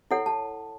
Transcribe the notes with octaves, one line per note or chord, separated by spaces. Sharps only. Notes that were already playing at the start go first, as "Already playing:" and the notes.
E4 A4 C#5 F#5
A5